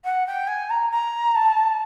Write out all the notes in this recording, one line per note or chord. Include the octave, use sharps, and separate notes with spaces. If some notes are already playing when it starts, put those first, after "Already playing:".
F#5
G5
G#5
A#5
A#5
A5